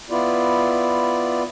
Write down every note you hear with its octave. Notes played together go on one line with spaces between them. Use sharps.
B3 E4 F4 D5